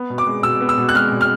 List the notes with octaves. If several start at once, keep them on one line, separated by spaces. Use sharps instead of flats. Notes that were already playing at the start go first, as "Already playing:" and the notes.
Already playing: B3
B2
D6
G#3
B2 E6
B3
E6
B2
F#6
G#3 F6
B2
F6